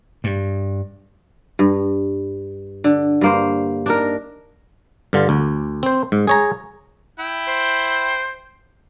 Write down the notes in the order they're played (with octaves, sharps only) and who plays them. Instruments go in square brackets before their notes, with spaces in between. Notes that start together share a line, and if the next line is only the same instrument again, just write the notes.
[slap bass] G2
[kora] G2
D3
G2 A#3 C5
D4 D#4 A#4
[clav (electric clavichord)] G2 D3 F4
D2
C4 C5
G#2
G#4 C#5 A#5
[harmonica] E4 G5
[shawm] C5